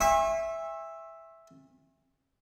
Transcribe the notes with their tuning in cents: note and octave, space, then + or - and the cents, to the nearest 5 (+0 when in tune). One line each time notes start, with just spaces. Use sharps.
E5 +0 G#5 -40 C#6 -45